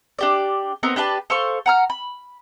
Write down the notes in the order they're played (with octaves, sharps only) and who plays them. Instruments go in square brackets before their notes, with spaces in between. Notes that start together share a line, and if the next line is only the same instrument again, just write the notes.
[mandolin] D4 G4 D5
B3 C4 D#4 A#4
D4 G4 B4 A5
A4 C5 F5 C#6
F#5 A#5 F6
B5